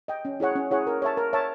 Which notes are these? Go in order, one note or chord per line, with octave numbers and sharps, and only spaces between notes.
D#5 G5
C#4
E4 G#4 C#5 F#5
C#4
E4 G#4 C#5 F#5
A#4
C#5 E5 A5
A#4
C#5 E5 A5